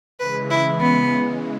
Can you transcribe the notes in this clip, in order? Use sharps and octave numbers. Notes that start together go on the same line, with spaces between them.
C#3 E3 G#3 B4
E4
B3